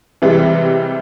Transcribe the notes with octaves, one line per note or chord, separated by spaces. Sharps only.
C3 E3 G3 G#3